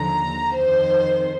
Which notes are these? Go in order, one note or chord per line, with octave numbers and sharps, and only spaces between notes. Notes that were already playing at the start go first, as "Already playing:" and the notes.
Already playing: D#2 D3 F3 A#5
F2 D#3 C5